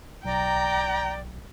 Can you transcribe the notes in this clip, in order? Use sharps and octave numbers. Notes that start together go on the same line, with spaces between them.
B1 D5 G5 A#5